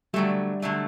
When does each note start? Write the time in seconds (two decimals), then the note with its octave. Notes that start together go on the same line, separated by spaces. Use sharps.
0.13 D3 F#3 G3 A3 G4
0.62 D3 F#3 A3